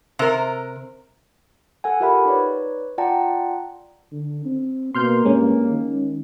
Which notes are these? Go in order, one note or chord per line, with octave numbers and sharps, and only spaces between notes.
C3 A#4
A4 F#5 G#5
F4 G4 A#4 E5 F#5 B5
D#4 B4 C#5 D5
F4 D5 F#5 G5 A5 A#5
D3
C4
B2 A#3 C6 F6 G6
G2 G#3 C#4
D#3